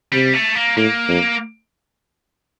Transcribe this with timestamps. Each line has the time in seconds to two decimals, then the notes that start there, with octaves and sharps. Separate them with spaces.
0.12 C3 G3
0.34 A3
0.55 A#3
0.76 A2 A#3
1.08 F2